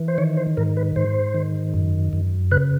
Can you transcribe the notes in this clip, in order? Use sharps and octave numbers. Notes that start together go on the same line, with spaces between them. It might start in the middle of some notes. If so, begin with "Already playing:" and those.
Already playing: E3
C5
D#3 C#5
C5
G#2 A#4
B4
G#2 C5
D#3
F#2
F#2
C#3 B4